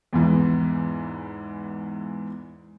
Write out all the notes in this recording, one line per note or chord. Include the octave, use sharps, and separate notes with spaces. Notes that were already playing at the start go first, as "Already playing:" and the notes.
E2 G#2 E3